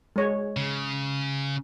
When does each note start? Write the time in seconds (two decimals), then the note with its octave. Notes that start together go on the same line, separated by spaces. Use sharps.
0.16 G#3 C#5
0.57 C#3